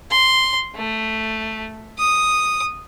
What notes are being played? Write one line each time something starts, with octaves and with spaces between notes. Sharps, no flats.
C6
A3
D#6